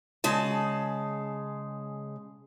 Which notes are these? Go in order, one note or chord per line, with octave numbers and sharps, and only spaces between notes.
C#3 G#3 A5